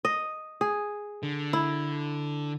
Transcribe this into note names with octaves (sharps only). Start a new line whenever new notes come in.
D#5
G#4
D3
E4